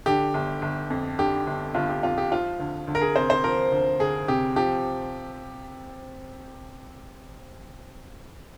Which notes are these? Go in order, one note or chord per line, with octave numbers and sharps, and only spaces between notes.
D3 G4
G1
G1
F2
D3 G4
G1
G1 F4
G4
F2 F4
G4
F3 F4
D2
D2
A#4
G#4
C3 C5
C5
F3 A#4
D2
D2 G#4
C3 G4
F3 G4